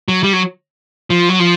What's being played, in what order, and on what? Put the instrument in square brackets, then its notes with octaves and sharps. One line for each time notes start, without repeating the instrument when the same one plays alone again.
[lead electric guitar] F#3
G3
F#3
F3
F#3
F3